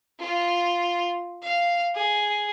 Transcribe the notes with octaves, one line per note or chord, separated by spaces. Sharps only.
F4
F5
G#4